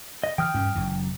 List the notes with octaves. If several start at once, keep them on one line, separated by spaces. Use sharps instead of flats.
D#5
E3 G5 D#6 F6
G2 C#4
F#1 F#2 E3